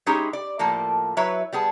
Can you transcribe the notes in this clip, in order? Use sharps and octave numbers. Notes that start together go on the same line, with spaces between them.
G#3 C#4 D#4 E4 G4 G#4
D5
A2 F3 A#3 A4
F#3 E4 B4 C#5 E5
G3 B3 G#4 A5